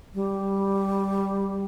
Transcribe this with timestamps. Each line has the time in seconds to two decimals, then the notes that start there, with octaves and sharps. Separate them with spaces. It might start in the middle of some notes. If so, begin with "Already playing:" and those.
0.14 G3